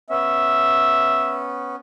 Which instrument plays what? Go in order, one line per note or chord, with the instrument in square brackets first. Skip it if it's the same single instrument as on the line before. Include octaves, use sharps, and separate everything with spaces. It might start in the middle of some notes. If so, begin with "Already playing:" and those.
[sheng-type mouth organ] B3 C#4 [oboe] E5